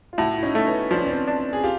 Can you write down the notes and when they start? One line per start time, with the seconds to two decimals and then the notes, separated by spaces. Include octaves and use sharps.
0.13 F4
0.18 A2 E4 F#4
0.38 E4
0.43 C#4 D#4
0.55 A3
0.67 B3 C#4
0.91 F3 D4
0.99 C#4
1.07 C4 D4
1.28 D4
1.53 G#4
1.63 F4 G4